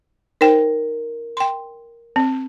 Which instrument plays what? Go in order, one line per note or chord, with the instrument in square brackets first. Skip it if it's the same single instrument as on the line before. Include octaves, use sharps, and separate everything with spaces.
[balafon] D#4 C5 G5 [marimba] A#4
[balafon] G5 C6
C4